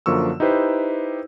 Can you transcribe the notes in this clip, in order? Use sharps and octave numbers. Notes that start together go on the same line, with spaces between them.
F#2 D3 F3 A#3 C#6 E6
D#4 E4 G4 B4 C5